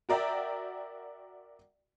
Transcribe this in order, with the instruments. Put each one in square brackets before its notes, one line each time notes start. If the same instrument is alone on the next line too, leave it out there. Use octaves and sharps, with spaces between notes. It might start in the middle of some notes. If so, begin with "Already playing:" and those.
[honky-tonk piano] F#4 A#4 D5 E5 G5